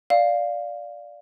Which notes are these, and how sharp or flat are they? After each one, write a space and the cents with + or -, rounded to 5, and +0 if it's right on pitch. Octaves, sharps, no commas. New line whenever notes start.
D5 +0 F5 +0